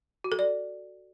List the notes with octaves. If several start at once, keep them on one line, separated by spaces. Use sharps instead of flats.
F#4
A4
D5